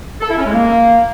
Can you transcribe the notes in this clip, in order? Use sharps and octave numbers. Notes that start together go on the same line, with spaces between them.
A4
E4
C#4
G#3
A#3